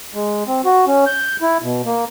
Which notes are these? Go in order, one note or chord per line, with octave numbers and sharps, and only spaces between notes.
G#3
C4
F#4
C#4
G6
E4
B2
A#3